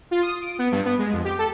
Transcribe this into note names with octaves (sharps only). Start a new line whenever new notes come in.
F4
D#6
D7
B3
G2
B3
G#3
F2
G4
A4